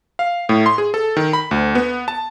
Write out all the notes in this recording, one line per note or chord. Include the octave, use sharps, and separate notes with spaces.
F5
A2
C6
G#4
A4
D#3
B5
D2
B3
A5